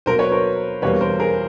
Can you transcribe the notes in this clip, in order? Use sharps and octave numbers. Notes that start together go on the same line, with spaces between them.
B2 F#3 A#3 A#4 C5
B4 C#5
A#4 C5
E2 B2 G3 A#3 B4 C#5
A#4 C5
G#4 A#4